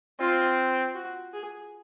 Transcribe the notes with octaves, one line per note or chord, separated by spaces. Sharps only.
C4 F4
F#4
G#4